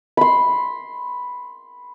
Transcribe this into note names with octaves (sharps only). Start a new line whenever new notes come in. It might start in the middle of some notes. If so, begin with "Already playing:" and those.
B5 C6